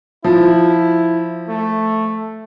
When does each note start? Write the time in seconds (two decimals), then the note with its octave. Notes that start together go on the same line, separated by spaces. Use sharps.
0.24 F3 E4
1.49 A3